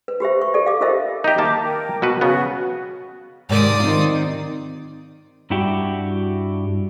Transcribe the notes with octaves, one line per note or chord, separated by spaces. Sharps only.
B4
F#4 G4 C5 E5
C#6
G4 A4 D5
F5 D6
F4 G4 A#4 C5 D#5 E5
D#4 G4 D#5 E5 A#5
D#3 A#3 A5 D6
A#4 G5
B2 F#4 B4
C#3 B3 F#4
G#2 C3 D#3 D5 D#6
D#3 C4 F4
G2 D4 E4 F#4 G4